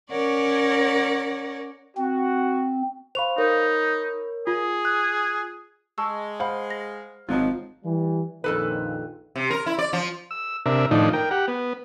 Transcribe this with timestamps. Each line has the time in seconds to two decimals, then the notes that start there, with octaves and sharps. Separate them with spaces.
0.11 C#4 A#4 C#5 D5 F#5
1.97 C4 F#4
3.15 C5 F5 B5 C#6 F7
3.38 D#4 A#4 C#5
4.47 F4 G#4
4.85 F#6
5.98 G#3 A5 C#6 E6
6.40 C5 F5 F#5 B5
6.70 A#6
7.29 G#1 D#3 F3 F#3 D#4 F4
7.84 E3 G3
8.44 A#1 F2 A#2 D#3 A4 B4
9.35 C3
9.50 A#4
9.66 E4
9.78 D5
9.93 F3
10.31 E6
10.66 C3 D4 A#4 E5
10.91 A2 D#3 F3 D4 D#4
11.13 A#4 G5
11.31 G4 F#5
11.48 B3